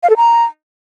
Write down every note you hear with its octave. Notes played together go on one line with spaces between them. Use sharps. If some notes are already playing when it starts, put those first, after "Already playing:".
F5
A4
A#5